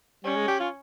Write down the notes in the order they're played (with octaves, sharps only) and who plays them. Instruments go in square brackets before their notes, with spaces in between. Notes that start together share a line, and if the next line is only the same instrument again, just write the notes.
[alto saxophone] G3 [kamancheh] C#4
[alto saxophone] G#3
G4
F4